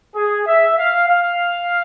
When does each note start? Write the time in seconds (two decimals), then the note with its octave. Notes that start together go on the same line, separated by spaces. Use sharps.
0.15 G#4
0.47 E5
0.78 F5
1.09 F5